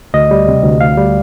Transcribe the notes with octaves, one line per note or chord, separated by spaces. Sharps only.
D2 D#5
G3
C3
D2
D2 F5
G3